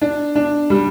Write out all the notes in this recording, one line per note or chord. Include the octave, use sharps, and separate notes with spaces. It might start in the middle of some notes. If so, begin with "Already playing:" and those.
D4
D4
G3